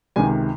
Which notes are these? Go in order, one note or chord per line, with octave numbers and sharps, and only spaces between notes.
C#2 C3 D#3 G#5